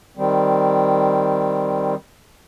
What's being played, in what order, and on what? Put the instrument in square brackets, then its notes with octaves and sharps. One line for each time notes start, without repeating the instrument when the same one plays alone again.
[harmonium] D#3 G3 C4